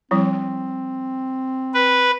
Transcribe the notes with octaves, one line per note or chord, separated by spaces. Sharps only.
F3 G3 C4 E4
B4